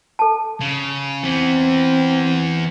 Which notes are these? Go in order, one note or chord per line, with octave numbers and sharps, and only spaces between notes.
A4 A5
C#3
E3 B3 C4